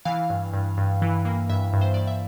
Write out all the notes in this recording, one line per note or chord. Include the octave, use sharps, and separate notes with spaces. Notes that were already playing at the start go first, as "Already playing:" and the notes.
E3 F5
G2
G2
G2
E3
A#3
G2 E5
G2
C5
G2 D5
E5